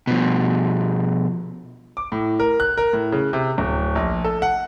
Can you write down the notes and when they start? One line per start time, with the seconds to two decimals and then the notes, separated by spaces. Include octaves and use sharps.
0.07 B2 F3
1.97 D6
2.12 A2
2.40 A#4
2.60 F#6
2.78 A#4
2.93 A2
3.12 C#3
3.33 C3
3.58 D1
3.95 A#1
4.24 A4
4.42 F#5